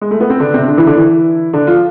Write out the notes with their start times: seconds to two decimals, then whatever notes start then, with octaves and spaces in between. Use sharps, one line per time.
0.01 G#3
0.11 A3
0.20 B3
0.30 C4
0.40 D3 D4
0.54 C3 C4
0.68 D3 D4
0.77 E3 E4
0.87 D3 D4
0.96 E3 E4
1.53 D3 D4
1.67 F3 F4